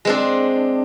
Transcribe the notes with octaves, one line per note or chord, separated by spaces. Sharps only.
G#3 C4 D4